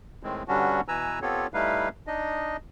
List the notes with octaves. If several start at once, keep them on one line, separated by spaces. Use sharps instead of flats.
A2 D#3 G#3 C4
G2 D3 G3 C#4 D4 F#4
B2 E3 B4 G#5 A#5 E6
B3 C4 F4 G4 A4 C#5
G3 A3 D#4 E4 B4 F5
D4 D#4 D#5